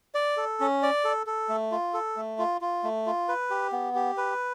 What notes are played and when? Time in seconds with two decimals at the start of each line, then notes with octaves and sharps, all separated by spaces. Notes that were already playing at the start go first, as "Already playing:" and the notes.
0.15 D5
0.37 A4
0.60 C#4
0.83 D5
1.04 A4
1.27 A4
1.49 A3
1.72 F4
1.94 A4
2.17 A3
2.39 F4
2.61 F4
2.84 A3
3.06 F4
3.28 B4
3.50 G4
3.72 B3
3.95 G4
4.17 B4